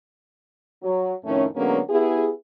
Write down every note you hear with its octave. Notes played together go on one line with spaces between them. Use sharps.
F#3
F2 A2 D#3 A3 C#4
D3 F#3 G#3 A#3 B3 C#4
B3 E4 G4 G#4